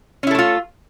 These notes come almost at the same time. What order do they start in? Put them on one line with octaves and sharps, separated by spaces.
C#4 E4 A4 A3 F4